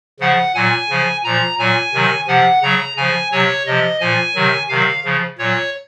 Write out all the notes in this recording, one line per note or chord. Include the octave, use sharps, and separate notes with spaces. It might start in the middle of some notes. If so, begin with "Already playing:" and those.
C#3 F3 F#5
A#2 F#3 G#5
C#3 F3
A#2 F3 A#5
A#2 F#3 G#5
C3 D#3 F#3
C3 F3 F#5
C#3 F#3 A#5
C#3 F3 G#5
C3 F#3 C#5
C3 F3 D#5
A#2 F3 G#5
C3 D#3 F#3
C3 D#3 F#3 F5
C#3 F3
A#2 F#3 C#5